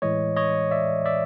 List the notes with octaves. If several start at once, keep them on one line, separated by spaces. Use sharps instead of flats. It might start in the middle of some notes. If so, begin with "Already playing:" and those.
A2 E3 G#3 C#5 D#5
C#5 D#5
D5 E5
D5 E5